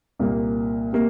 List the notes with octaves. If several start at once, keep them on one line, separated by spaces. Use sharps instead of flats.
C2 A#2 A#3
C3 A#3